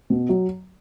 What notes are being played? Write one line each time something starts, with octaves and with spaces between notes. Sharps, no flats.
B2
F#3